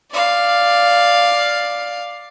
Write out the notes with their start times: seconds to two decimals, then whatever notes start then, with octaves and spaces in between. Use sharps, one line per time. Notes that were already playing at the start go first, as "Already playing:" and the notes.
0.12 D5 F5